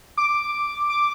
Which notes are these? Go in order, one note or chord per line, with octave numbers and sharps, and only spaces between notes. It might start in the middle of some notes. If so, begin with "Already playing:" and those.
D6
D6